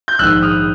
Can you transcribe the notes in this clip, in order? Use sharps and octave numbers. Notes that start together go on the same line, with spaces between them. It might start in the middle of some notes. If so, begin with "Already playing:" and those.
G6
A#1 G#2 D#3 E6 F#6
D#6 F6